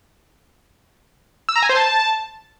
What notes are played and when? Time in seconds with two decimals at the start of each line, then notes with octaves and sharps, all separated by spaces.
1.49 E6
1.56 A#5
1.62 G#5
1.69 C5
1.76 A5